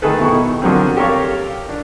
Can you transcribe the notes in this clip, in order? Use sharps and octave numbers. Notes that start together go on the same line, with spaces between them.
D#3 A3 G#4 A4 B4
B2 D#3 E4 C#6
D3 F3 F#3 A#3 C4
G4 A4 A#4 C#5 F5
D4